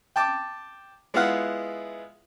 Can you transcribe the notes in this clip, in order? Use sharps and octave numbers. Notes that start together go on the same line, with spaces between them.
G5 A5 D6
G#3 B3 E4 F4 F5 F#5